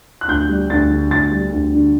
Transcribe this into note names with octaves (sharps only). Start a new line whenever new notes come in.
F#6
D2 G6
G3
D2 A6
D3
D2 A6
G3
D2
D3